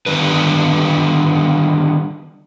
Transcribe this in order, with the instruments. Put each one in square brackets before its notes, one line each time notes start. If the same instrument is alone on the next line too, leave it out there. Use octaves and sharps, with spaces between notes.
[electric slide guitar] D3 D#3 G3 B3 D4 B4